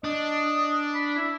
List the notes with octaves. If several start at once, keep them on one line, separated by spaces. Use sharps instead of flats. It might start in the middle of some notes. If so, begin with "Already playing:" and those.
D4 D#5
B5
E4